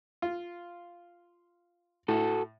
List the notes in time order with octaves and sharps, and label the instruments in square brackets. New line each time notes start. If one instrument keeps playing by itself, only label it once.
[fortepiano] F4
[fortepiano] A2 [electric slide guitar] F#4 A4